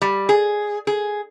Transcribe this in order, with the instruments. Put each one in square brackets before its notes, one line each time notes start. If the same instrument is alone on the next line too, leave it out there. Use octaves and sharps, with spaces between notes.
[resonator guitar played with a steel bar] G3
G#4
G#4